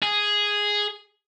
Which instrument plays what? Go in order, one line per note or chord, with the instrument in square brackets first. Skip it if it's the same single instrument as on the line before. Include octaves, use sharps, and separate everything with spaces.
[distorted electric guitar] G#4